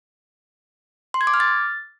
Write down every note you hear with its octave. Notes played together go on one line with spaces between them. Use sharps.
C6
G#6
D6
F6
A6